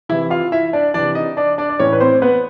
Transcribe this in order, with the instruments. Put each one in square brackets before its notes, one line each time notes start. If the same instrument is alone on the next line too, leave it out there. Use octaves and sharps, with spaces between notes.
[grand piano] C3 E3 E4 E5
F4 F5
E4 E5
D4 D5
C3 E3 D4 D5
D#4 D#5
D4 D5
D4 D5
D5
A2 E3 C#4 C#5
B4
C4 C5
B3 B4